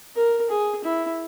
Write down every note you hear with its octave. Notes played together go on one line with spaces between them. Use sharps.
A#4
G#4
E4